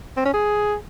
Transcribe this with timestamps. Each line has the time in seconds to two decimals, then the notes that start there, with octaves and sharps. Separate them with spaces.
0.17 C4
0.25 C#4
0.34 G#4